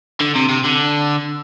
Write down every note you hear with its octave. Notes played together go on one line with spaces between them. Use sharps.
D3
C3
C3
D3